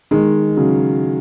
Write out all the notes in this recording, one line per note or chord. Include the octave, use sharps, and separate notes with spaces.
D#3 G#3
C#3 F#3